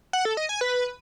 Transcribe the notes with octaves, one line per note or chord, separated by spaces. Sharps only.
F#5
A4
D#5
G#5
B4